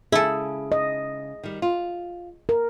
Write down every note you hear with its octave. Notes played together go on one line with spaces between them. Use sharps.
C#3 E4 G#4 A4
D#5
D#3 G3
F4
A#4